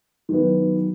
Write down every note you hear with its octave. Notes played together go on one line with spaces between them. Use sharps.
D#3 F#3 B3